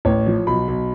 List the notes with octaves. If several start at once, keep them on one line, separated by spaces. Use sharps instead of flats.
A1 C#5
F3
B1 B5
B1